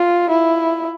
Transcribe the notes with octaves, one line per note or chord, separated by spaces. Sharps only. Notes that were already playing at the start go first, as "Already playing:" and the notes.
Already playing: F4
E4